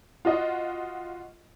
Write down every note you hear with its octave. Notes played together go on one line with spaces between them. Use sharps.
F4 F#4 D#5